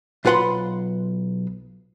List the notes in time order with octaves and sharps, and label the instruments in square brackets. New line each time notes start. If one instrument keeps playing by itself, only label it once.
[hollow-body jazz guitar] B1 F4 B4 F#5 B5 C6